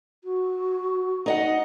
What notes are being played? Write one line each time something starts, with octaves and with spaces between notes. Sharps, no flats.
F#4
D#4 D#5 F#5